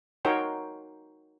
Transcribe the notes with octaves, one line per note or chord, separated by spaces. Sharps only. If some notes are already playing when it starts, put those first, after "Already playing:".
D#4 F#4 A#4 C#5 G5 C6